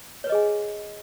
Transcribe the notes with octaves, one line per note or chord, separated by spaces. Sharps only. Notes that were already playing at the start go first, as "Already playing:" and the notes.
G#4 B4 C#5 D#5 G#5